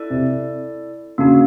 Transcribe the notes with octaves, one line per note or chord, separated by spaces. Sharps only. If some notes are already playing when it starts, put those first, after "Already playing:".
Already playing: E4 A4 D5
C3
C#3 A#3 D4 F#4